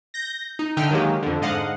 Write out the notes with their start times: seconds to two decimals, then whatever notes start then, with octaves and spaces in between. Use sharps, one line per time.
0.14 G6 A#6
0.59 D#4
0.77 D3 D#4 E5 G5 F6
0.91 D#3 F#3 G#3 A#3 G4
1.23 F2 D3
1.41 G#2 D3 D#5 F5 F#5